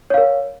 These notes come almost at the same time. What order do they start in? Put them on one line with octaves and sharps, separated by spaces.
C#5 F5 A#4